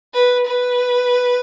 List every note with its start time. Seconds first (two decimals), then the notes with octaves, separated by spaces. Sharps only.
0.14 B4
0.47 B4